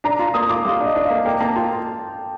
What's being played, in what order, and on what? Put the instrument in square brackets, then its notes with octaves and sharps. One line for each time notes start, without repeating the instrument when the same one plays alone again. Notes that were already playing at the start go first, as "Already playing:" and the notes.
[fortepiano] D4 [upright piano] A#5
[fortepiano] F4 [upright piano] A#5
[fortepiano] A#3 [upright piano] D#6
[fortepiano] F4 [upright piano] D6
[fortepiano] G3 [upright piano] F5
[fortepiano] D4 [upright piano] D#5
[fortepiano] D4
[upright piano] F5
[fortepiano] A#3
[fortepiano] A#3 [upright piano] G5
[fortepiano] A#3 [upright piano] A5
[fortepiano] F4 [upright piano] G5